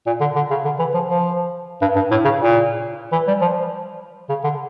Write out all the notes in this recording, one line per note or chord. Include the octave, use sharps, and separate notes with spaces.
A#2
D3
D3
C#3
D3
E3
F3
F3
G2
G2
A2
C#3
A#2
E3
G3
F3
C#3
D3